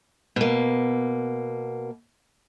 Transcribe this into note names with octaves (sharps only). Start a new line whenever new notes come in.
B2 A#3